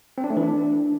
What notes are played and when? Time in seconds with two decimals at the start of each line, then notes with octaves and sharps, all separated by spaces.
0.18 C4
0.24 D4
0.30 A3
0.37 E3
0.43 D4